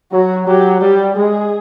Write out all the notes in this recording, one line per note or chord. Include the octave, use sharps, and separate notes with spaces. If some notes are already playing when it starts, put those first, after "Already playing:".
F#3 F#4
F#3 G4
G3 G4
G#3 G#4